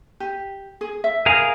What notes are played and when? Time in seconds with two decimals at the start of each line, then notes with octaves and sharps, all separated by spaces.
0.20 G4
0.81 G#4
1.04 E5
1.26 G#4 A#4 F5